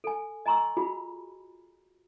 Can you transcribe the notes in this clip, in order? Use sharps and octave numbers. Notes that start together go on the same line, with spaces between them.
A4 G#5
D#5 G#5 A#5 C6 C#6 E6
F4 F#4 G#4 B5